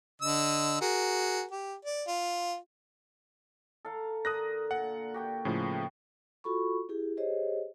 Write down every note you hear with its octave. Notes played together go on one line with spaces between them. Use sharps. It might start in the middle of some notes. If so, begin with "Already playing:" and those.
D3 D#5 E6
F#4 G#4 A#4
G4
D5
F4
A4 F5 A#5
D3 A#4 D#6 F#6 A#6
A#2 F#5
F#4 G4 G5
A2 C#3 F3
F4 F#4 A4 B5 C#6
E4 G4 G#4
G4 G#4 C5 C#5 D#5